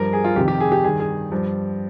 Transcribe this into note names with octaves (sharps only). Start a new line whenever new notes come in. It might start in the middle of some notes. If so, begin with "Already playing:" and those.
Already playing: G2 F3 A#4
G#4
F4
F2 C3 D#3 G4
G4
G#4
G4
G2 D#3 G#4
G#4
G2 F3